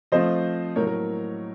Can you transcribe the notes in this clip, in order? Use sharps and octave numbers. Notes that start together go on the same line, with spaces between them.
F3 A3 C4 F4 C5 D#5
A2 F#3 A#3 A#4 C#5
A#4